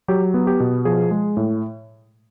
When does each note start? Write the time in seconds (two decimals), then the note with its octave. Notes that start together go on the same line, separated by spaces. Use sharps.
0.08 F#3 G4
0.34 B3
0.47 G4
0.60 B2
0.85 F3 G#4
1.11 G#3
1.37 A2